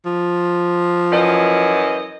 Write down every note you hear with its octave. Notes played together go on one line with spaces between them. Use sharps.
F3
F#2 E3 D#5